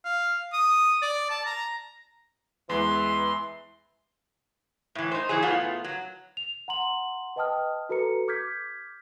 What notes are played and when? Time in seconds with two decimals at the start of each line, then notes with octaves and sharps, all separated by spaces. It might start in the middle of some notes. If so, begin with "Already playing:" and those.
0.05 F5
0.53 D#6
1.02 D5
1.30 A5
1.46 A#5
2.69 E2 E3 G#3 B4 C6
4.95 A2 E3
5.11 D#4 C5
5.29 E3 F#3 G#4
5.43 A2 B3 F4
5.84 F#3
6.37 F7
6.68 F#5 A#5 C6 F#7
7.36 B4 D#5 G5 A5 D#6 F6
7.89 F#4 A4 B4 A#5 C#7
8.28 D6 F6 G6 G#6 B6